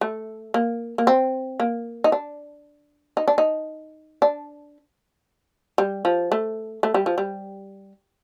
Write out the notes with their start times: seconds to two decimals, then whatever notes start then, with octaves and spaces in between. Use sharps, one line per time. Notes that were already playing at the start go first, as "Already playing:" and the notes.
0.01 A3
0.54 A#3
0.98 A#3
1.07 C4
1.60 A#3
2.04 D#4
2.12 D4
3.17 D#4
3.28 D4
3.38 D#4
4.22 D4
5.78 G3
6.05 F3
6.32 A3
6.83 A3
6.94 G3
7.06 F3
7.18 G3